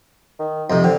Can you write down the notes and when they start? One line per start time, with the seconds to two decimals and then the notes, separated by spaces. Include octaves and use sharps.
0.39 D#3
0.70 F2 C3 D#4
0.84 D3 C4